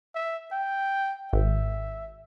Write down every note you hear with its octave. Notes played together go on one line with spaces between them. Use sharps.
E5
G5
G#1 E5